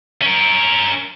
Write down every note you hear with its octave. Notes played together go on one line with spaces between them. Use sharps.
C#4 A#4